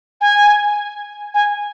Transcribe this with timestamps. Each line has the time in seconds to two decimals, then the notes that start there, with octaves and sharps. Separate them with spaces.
0.21 G#5
1.34 G#5